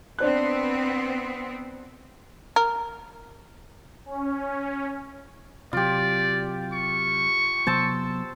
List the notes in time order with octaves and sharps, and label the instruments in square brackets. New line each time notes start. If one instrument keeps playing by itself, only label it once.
[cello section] B3 C4 [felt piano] D4 C5 F#6
[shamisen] A#4
[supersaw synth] C#4
[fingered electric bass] C3 F#3 [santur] F4 G4 [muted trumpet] D5
[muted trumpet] C#6
[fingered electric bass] C3 F#3 B3 [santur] C5 A5 E6